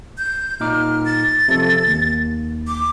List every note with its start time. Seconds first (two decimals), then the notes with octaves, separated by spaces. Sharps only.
0.18 G6
0.60 A#2 D#4 D6 F6
1.05 A6
1.48 C3 F3 A4
1.87 D#2
2.67 D6